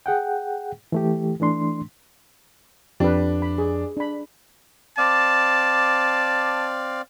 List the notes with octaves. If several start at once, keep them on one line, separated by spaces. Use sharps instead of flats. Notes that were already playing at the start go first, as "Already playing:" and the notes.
G#4 F#5 G5
E3 A3 G4
E3 A3 D4 C6
F2 D4 G4 B4
B5
G#4
D4 B5
C4 D5 F5 A5 D6